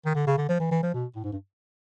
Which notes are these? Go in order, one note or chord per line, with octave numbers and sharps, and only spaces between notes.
D#3
D3
C#3
D3
F3
E3
E3
F3
B2
A2
G#2
G2